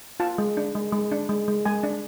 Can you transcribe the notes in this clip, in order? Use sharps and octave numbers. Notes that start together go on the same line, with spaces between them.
F4 A5
G#3
D4
G#3
G#3
D4
G#3
G#3
G#3 G#5
D4